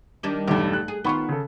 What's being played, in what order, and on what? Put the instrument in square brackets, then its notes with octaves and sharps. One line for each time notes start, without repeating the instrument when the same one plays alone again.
[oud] D#3 G3 D4
[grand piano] B1 E2 G2 [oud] A3 G4
[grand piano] F#6
[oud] G#4
[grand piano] D#3 B5 C#6 [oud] B3 C4 F4
[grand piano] C#3 A4